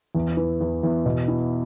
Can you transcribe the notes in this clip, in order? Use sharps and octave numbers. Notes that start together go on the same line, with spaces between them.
E2
E3
E2
E2
B2
E4